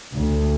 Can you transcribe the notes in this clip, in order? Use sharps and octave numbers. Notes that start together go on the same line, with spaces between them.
D2